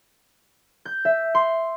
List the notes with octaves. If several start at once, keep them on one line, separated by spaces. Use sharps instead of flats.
G6
E5
C6